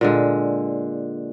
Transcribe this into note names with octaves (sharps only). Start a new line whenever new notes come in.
A#2 D3 G#3